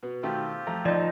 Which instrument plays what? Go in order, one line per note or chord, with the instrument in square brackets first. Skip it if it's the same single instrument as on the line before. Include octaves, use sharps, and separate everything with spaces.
[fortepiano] B2 B3
[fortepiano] B2 D#3 A3 [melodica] C4 F4 G4
[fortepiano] F2 A3 A#5
[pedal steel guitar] F3 D#4 [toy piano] D5 D#5